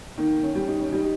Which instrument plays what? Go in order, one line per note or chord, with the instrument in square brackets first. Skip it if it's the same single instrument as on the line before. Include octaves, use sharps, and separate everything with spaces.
[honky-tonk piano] D#3 [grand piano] A#3
[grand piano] C#4
[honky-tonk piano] G3
[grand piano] D#4
C#4
[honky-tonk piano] G3 [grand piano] D#4